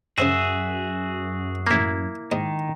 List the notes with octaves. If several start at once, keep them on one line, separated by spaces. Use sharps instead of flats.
F#2 C#3 F#4 G#4 C5 E5 G5
A1 A#3 E4 B5
G#2 D#3 D#5